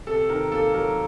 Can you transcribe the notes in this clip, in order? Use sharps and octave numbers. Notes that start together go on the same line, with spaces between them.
C3 A4
D#3 A#4
A#3 A4
F#3 A#4